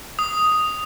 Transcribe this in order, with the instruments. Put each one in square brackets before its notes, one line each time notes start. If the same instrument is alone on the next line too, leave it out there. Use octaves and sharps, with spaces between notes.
[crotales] D#6